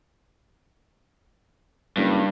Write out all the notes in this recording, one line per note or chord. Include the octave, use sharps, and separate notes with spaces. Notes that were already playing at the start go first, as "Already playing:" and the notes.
F#1 G2